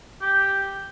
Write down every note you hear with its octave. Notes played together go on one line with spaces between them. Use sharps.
G4